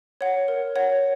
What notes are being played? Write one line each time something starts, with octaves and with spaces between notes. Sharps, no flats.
C#5 F#5
A#4
C#5 F#5